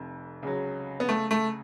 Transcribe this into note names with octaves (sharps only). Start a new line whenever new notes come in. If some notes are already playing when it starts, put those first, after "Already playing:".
Already playing: F1 F2
C#2 C#3 F#3
B3
A3
A3